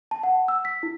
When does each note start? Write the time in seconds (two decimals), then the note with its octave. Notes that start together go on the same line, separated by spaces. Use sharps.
0.11 A5
0.23 F#5
0.48 E6
0.65 B6
0.83 E4